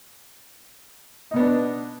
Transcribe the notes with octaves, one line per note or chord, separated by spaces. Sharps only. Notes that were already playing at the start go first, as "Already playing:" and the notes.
B2 B3 D4 D#4